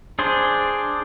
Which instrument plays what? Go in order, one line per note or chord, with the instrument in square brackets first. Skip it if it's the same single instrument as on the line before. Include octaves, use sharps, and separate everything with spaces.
[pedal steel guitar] D4 G#4 C5